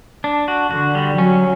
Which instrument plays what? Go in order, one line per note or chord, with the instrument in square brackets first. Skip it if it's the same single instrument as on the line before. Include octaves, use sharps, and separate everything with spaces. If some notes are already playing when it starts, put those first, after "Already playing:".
[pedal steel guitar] D4
F#4
[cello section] D3 [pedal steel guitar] F#4
[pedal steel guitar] G3
[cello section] F#3 [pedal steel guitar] C#4